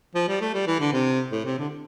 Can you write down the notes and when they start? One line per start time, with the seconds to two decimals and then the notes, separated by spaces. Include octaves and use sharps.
0.15 F3
0.28 G3
0.41 A3
0.54 G3
0.67 E3
0.80 D3
0.93 C3
1.32 A2
1.45 C3
1.58 D3